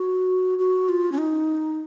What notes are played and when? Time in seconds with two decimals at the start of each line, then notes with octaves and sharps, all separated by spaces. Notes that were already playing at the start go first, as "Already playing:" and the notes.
Already playing: F#4
0.59 F#4
0.89 F4
1.12 C#4
1.18 D#4